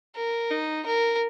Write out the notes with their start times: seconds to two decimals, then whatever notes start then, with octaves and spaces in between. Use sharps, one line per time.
0.16 A#4
0.51 D#4
0.86 A#4